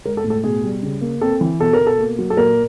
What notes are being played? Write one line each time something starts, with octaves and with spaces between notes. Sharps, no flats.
G#3 A#4
A4
A2
A4
B2 G#4
G3
C#3
A#3
C4 A4
E3
B2 A4
A#4
B2
A4
A#3
F#3
A4
A#2 A#4